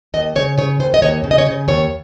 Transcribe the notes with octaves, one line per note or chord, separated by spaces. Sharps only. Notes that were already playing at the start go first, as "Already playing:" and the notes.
D#2 D#5
C#3 C#5
C#3 C#5
D#2 C5
D#5
D#2 C#5
C#3
D#5
C#5
C#3 D#5
D#2 C#5